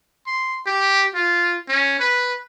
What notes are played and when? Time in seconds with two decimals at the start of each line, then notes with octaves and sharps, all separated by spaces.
0.27 C6
0.66 G4
1.14 F4
1.68 C#4
2.00 B4